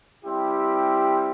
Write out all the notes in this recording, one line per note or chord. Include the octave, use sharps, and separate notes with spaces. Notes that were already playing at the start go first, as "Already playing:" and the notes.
G3 C4 E4 G4